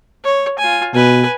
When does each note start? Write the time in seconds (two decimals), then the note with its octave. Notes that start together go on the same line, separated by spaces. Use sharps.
0.24 C#5
0.59 F4 G#5
0.95 B2 B4 G#5